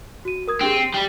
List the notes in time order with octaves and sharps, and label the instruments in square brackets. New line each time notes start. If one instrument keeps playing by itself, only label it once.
[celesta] F#4 D#7
A#4 D#6 G#6
[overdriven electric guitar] C4 [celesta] D4 G4 G#4
[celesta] D#7
[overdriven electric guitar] G3